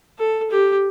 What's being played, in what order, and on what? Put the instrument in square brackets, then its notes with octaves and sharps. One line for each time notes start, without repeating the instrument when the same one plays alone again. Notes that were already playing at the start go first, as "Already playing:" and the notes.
[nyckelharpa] A4
G4